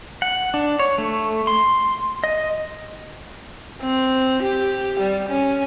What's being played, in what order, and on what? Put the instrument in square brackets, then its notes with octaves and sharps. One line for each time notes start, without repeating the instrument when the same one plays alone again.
[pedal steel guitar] F#5
D4
C#5
A3
C6
D#5
[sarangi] C4
G4
G3
C#4